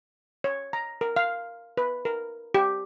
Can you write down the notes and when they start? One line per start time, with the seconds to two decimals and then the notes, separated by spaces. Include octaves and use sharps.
0.44 C#5
0.73 A#5
1.01 A#4
1.16 F5
1.77 B4
2.05 A#4
2.54 G4